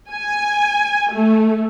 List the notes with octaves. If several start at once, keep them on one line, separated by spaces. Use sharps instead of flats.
G#5
A3